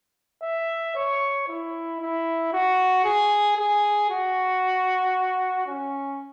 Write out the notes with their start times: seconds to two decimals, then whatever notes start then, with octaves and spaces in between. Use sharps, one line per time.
0.42 E5
0.96 C#5
1.48 E4
2.01 E4
2.53 F#4
3.05 G#4
3.57 G#4
4.10 F#4
5.67 C#4